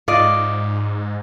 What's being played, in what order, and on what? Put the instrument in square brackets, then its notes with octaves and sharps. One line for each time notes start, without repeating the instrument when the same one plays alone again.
[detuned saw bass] G#2 [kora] F4 D5 D#5